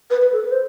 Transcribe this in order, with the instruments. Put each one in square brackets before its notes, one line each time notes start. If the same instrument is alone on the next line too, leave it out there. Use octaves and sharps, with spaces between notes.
[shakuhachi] B4
B4
A4
B4
C5